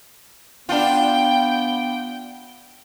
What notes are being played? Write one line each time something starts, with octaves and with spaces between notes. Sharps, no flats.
B3 D4 F4 G5